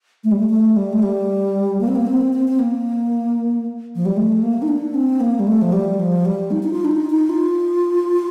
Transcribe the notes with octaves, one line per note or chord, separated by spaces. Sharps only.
A3
G3
A3
A3
G3
A3
G3
A#3
C4
A#3
C4
C4
C4
A#3
F3
G3
A3
A#3
D#4
D4
C4
A#3
G3
A3
F3
G3
F3
G3
D#4
D#4
F4
D4
D#4
D#4
F4